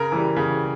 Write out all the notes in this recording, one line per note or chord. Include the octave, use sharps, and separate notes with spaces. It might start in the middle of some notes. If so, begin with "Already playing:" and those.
Already playing: C#3 A#4
E3 G3
C#3